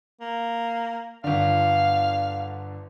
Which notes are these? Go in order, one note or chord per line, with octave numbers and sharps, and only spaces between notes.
A#3
G1 D3 F5